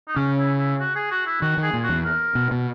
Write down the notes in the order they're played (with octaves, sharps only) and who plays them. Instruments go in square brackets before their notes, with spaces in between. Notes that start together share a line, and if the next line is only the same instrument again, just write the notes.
[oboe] D#4
[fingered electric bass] C#3 [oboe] C#4
[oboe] E4
E4
F#4
G#4
F#4
E4
[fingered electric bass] D#3 [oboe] F#4
[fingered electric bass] D#3
[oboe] G#4
[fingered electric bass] A#2
[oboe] F#4
[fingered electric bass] E2
[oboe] A#4
[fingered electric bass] B2
B2